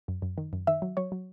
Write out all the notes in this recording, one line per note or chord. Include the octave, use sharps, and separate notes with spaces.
F#2
F#2
D#3
F#2
D#3 E5
F#3
F#3 C#5
F#3